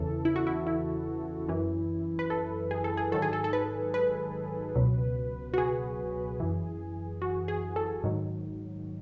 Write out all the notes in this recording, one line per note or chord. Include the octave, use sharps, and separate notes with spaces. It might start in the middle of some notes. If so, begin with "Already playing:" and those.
Already playing: E2 C#3 E3 A4
E4
F#4
E4
E4
F#2 E3
B4
A4
G#4
A4
G#4
G#2 D#3 F#3 A4
G#4
A4
A4
B4
B4
C#2 B2 F#3
F#4
G#4
F#2 E3
F#4
G#4
A4
G#2 D#3 F#3